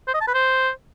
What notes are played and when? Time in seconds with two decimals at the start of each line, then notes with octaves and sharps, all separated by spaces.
0.08 C5
0.14 D#5
0.21 A5
0.28 B4
0.34 C5